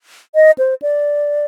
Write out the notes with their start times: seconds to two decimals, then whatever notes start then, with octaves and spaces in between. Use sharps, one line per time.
0.35 D#5
0.58 C5
0.82 D5